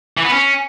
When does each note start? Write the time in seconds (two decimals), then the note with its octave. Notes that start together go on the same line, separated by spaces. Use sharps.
0.17 E3
0.25 B3
0.32 C#4